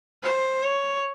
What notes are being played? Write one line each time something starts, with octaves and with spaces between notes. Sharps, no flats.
C5
C#5